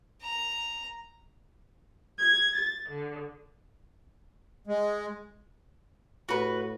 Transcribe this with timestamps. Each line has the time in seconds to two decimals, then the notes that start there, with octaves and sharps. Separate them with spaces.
0.22 A#5
2.18 G#6
2.55 A6
2.88 D3
4.67 G#3
6.29 A2 F#4 B4